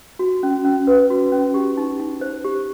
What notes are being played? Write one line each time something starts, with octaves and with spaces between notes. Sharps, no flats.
F#4
C#4
C#4
B4
F#4
C#4
G4
D#4
D#4
C5
G4